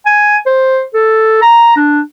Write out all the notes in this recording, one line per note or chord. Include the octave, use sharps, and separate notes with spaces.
G#5
C5
A4
A#5
D4